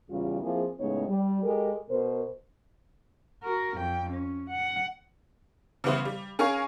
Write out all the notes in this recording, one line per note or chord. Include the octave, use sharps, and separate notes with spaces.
E2 C#3 G3 F4 G4
F3 A#3 C4 E4 G#4
A2 C#3 G#3 B3 D#4 C#5
G3
G#3 G4 A4 A#4
B2 A#4 C5
F#4 A#4
F2 G5
C#4
F#5
C#3 E3 G3 B3 E4 C5
G3
C#4 G#4 A#4 F5 G#5 C#6